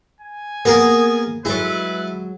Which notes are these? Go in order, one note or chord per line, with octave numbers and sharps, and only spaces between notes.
G#5
A#3 B3 G#4 A#4
F#3 G#3 E4 A4 B4